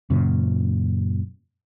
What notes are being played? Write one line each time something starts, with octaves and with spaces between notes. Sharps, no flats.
F#2 A#2 C#3